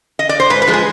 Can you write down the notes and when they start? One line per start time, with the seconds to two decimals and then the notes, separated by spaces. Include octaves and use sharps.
0.19 D#5
0.29 D5
0.40 C5
0.50 G#2 B4
0.62 B4
0.67 F3 G#3
0.74 G#4